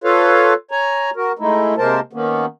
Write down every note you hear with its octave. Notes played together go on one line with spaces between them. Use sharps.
F4 A4 B4 C#5 F5
C#5 G#5 A#5
F#4 A#4
G#3 A3 D#4 E4
C3 G#3 A#3 A#4 C5 A5
D#3 A#3 B3 C#4